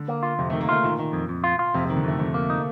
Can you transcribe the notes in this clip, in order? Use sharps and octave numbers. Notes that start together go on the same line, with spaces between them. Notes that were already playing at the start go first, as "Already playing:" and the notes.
Already playing: D3
A#3
F4
F2 C3
D#3 A3
A#3
A3 F4
A#2 D#3
D#3
F2
F2
F4
F4
F2 C3
C3 D#3
D3
F2 A3
F2 A3
A#3
D#4